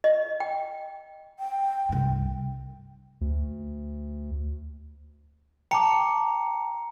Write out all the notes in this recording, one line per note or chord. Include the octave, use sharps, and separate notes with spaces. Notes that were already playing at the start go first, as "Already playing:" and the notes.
D#5
G5
G5
C2 G2
D2
G5 A5 A#5 D6 C#7